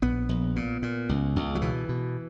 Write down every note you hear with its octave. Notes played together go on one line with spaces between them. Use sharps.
A#1 B3
A#1
A#2
A#2
C#2
C#2
F#3
B2 E3
B2